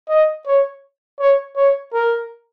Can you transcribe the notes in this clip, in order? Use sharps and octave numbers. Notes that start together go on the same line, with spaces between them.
D#5
C#5
C#5
C#5
A#4